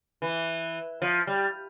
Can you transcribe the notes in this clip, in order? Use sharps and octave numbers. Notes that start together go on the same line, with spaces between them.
E3
F3
G3